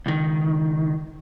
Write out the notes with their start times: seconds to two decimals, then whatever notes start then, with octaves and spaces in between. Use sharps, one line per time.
0.06 C#2 D#3